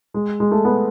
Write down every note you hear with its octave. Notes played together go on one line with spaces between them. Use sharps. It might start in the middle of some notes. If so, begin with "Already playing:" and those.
G#3
G#3
A3
B3